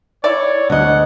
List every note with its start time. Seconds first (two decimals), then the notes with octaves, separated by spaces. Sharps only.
0.24 E4 C#5 D5
0.70 D2 D#5 F#5